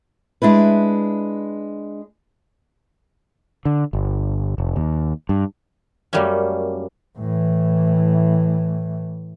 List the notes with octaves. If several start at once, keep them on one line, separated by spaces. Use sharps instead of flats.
G#3 D4 E4 B4
D3
G1
F1
D#2
G2
F#2 G3 A3 A#3 C#4
A2 E3